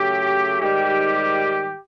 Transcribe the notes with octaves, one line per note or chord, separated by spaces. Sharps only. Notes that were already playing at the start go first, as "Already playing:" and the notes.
Already playing: C#3 F#3 A3 G4
G#2 D#3 G3 G4